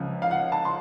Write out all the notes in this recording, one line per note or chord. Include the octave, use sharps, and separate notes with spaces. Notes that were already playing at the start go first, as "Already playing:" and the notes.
Already playing: C#2 C#3 F3
F5
F#5
A5
C6